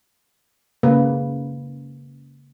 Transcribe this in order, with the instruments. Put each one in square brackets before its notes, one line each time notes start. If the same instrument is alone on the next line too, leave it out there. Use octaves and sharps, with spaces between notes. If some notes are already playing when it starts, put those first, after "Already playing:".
[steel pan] C#3 A#3 B4